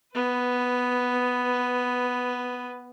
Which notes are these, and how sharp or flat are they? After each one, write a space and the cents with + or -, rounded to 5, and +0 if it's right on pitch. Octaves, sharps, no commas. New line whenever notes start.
B3 +0 B4 +15